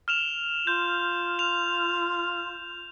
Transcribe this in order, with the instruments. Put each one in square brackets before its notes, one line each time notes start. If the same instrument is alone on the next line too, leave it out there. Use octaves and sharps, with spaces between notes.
[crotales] F6 E7 F7
[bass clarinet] F4 [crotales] G6
[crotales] F7